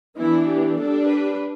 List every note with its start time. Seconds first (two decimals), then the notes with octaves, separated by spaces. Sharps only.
0.18 E3 B3 D4 E4
0.48 G4
0.78 G3 D4 A4
1.08 B4